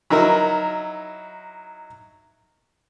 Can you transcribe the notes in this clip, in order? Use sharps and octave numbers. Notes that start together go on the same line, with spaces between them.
F#3 D#4 E4 A#4